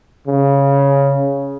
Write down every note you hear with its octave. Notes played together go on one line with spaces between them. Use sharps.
C#3